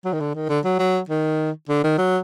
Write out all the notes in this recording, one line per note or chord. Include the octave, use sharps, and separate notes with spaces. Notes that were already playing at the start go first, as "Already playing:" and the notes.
F#3
D#3
D3
D#3
D3
F#3
F#3
D#3
D3
D#3
F#3